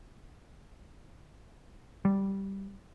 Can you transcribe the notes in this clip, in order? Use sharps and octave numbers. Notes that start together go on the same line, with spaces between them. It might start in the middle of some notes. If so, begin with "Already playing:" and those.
G3